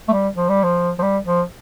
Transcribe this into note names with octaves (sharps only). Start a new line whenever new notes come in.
A3
G3
F3
G3
F3
F3
G3
F3